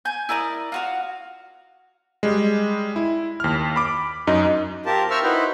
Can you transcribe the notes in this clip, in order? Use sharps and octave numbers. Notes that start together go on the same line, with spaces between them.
G#5 G6
E4 A#4 D5 D#6
F4 F#4 F5
G3 G#3
E4
D#2 F6
B5 D6
F#2 D#4 D#5
C4 F4 G4 A#4 A5
A#4 C5 E5 C#6 E6 F6
D#4 E4 F#4 B4 C5